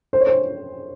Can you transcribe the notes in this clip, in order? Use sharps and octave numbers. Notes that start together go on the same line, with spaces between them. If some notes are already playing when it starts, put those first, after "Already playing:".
C5
C#5
C5